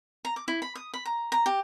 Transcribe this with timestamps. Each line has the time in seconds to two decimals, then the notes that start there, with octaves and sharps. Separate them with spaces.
0.25 A#5
0.36 D6
0.48 E4
0.62 B5
0.75 D#6
0.94 B5
1.05 A#5
1.32 A#5
1.46 G4